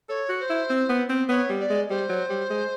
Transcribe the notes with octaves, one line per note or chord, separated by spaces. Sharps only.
A4 C#5
F#4
C5
E4
C4
B3
C4
B3 C#5
G3
D5
G#3
G3 C5
F#3
G3
G#3